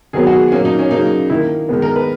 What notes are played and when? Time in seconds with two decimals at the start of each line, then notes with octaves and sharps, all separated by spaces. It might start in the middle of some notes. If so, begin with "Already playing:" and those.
0.13 D#3 F#3 B3 G#4
0.27 F#4
0.33 G#4
0.52 A#2 F#3 A#3 C#4
0.65 D#4
0.79 C#4
0.91 C#3 F#3 A#3 D#4
1.30 D#3 A#3 E4
1.69 D#3 G#3 B3
1.82 A#4
1.96 B4